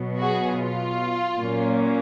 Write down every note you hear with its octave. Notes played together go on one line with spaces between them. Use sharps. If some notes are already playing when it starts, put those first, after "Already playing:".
Already playing: B2 F#3 B3
F#4 G#4
F4
A#2 F#3 A#3 C#4